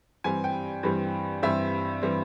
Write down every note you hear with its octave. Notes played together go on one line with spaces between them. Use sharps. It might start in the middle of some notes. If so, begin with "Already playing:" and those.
G2 E3 G3 C4 G#5
G5
G2 E3 G3 C4
G2 E3 G3 C4 E5
E3 G3 C4